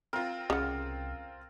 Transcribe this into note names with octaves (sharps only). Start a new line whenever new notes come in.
C4 F4 A#4
C2 C#3 F#5